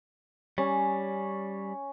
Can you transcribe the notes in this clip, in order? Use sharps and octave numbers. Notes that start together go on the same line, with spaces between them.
G3 C#4